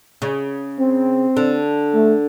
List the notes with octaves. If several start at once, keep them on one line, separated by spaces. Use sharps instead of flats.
C#3
C4
D3
A3